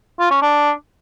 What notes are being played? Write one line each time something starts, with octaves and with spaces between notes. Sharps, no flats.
F4
C#4
D4